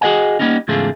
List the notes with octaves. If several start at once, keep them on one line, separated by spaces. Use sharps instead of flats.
F#4 G#4 B4 D#5 F#5 G#5
G3 A#3 B3 C#4 D#4
E2 G#2 C#3 A3 F4 G#4